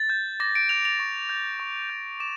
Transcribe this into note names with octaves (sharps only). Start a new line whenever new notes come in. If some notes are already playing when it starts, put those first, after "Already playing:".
Already playing: A6
G6
D6 A#6
D7
G6 F7
F7
C#6
G6
C#6
G6
D6 E7